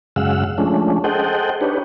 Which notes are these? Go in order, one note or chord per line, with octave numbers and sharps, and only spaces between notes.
F#2 C#3 G#3 F5 F#5 E6
F3 G#3 A3 C#4 D4
G#4 A4 C5 D#5 F#5 G5
D4 D#4 G4 B4 C#5